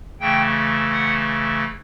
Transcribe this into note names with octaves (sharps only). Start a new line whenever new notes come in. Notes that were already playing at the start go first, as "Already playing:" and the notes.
C#3 E3 A3 G5
F#5